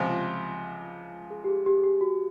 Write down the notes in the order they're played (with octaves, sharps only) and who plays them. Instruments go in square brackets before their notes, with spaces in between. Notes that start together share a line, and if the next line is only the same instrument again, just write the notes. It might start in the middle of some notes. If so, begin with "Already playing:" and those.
Already playing: [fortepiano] C#2 C3 F3
[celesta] G#4
G4
G#4
G4
G#4
G4
F#4